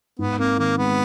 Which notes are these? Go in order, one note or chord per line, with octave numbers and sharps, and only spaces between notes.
G#2 B3
A#3 C4
D#3 A#3
G#3 B3